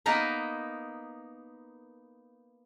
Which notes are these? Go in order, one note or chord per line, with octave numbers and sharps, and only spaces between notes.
A#3 B3 D#4 A#4 B4